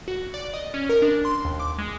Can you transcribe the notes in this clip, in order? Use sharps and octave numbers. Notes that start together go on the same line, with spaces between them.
F#4
D5
D#5
C#4
A#4
D4
C6
D#2
D6
G#3